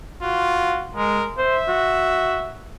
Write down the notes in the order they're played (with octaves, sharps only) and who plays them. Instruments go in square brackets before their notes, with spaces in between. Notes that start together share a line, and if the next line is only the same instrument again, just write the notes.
[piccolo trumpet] F4 [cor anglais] F#4
[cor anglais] G#3 [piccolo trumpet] A#4
[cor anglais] C5 [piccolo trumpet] E5
[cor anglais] F#4